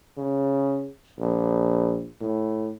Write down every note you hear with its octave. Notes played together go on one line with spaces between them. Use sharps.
C#3
A#1
A2